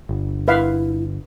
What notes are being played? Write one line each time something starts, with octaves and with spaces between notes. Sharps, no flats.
G1
E4 B4 E5 F5